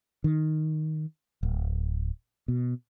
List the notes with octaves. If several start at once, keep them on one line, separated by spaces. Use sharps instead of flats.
D#3
D1
B2